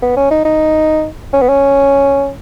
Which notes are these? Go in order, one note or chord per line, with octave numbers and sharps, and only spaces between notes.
B3
C#4
D#4
D#4
C#4
B3
C#4